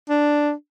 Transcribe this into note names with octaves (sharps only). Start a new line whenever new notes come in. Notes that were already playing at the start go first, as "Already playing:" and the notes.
D4